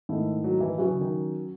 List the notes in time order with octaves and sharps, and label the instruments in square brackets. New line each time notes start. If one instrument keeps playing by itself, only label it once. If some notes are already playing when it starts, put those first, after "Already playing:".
[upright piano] G#2 D#3 A3 E4
[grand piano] F#3
E3
[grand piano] E3 [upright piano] F#3 C#4 F#4
[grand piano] C#3
D#3